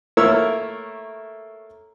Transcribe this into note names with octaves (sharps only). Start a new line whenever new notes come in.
A3 A#3 E4 A#4 C#5 E6